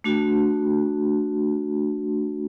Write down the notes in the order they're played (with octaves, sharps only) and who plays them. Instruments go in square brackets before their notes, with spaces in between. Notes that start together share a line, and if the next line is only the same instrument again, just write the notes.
[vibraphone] A3 D4 F#4